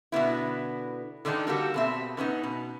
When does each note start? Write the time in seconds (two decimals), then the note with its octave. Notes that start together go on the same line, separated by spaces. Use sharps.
0.12 B2 D3 B3 E4
1.25 D3 D#3 D4 D#4 A4
1.47 G3 A#3 F#4 G4 A4
1.74 B2 C4 E5
2.17 D3 B3 C#4 D#4
2.43 B2